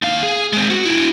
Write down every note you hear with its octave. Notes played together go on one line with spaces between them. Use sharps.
D#2 F5
G#4
G#3 C4
F#4
E4 F#4